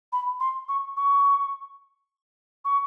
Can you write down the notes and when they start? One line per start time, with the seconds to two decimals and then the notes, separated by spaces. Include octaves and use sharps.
0.12 B5
0.40 C6
0.68 C#6
0.97 C#6
2.65 C#6